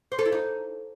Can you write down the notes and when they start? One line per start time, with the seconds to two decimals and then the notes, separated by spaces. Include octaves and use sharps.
0.12 C5
0.19 A4
0.25 E4
0.32 D#4